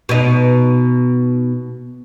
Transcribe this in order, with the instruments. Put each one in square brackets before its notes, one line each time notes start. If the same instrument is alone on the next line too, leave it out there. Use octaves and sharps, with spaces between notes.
[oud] B2 D#4